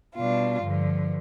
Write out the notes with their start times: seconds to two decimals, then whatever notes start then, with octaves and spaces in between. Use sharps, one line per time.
0.16 B2 G3 D4 F4
0.63 G2 D3 F3